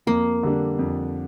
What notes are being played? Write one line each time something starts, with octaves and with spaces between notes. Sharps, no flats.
F2 A#3
D3 G3 D4
F2